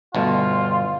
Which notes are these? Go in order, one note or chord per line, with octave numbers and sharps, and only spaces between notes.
G1 B2 A3 F4